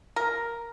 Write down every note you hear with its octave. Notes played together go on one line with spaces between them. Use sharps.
A#4